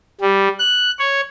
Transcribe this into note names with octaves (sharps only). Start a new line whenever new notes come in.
G3
F#6
C#5